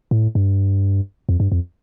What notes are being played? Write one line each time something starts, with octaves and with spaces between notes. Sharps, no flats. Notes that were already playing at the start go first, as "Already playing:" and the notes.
A2
G2
F2
G2
F2